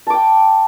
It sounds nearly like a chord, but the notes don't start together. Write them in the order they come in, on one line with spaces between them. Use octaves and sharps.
A5 D6 G5